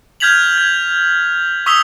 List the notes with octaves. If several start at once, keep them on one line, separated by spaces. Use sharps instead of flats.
F6 G6 G#6 B6 F7 F#7
G#6
C#6 D#6 E6 B6 F7 G7